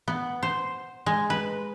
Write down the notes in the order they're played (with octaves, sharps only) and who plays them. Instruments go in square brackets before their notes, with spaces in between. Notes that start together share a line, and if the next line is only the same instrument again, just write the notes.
[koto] B3
C5
G#3
B4